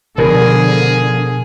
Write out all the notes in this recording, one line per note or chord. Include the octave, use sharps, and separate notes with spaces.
B2 D3 F3 G#4 A#4